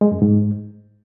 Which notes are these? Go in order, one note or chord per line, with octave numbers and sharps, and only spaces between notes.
G#3
F#2
G#2